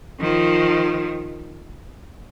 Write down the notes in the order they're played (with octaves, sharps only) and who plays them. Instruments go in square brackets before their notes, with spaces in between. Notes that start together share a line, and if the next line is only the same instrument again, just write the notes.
[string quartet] D#3 F3